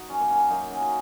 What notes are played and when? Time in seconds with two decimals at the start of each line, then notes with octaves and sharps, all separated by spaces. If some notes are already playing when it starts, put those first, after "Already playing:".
Already playing: D#4 F#4
0.09 F#2 F#3 C#4
0.20 A#3
0.30 C#4
0.50 F#2 F#3 A#3 D#4
0.71 C#4 F#4